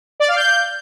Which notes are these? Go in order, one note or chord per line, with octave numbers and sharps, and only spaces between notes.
D5
F5
G6